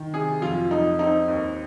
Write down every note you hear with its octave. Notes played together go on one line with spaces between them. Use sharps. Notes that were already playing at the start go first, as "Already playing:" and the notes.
Already playing: D#3
C3 G#4
F2 F4
F2 D#4
C4 D#4
D#2